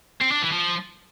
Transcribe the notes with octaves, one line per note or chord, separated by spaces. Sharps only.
C4
D4
E3
F3